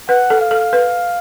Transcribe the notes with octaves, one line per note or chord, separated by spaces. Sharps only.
B4 F#5
A4
F5
A4
B4